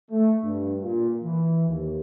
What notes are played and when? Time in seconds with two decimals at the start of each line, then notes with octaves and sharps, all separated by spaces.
0.10 A3
0.42 G2
0.81 A#2
1.23 E3
1.67 D#2